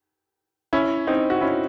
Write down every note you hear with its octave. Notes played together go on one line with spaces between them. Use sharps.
C#4 E4
C4 D#4
F#4
C#4 E4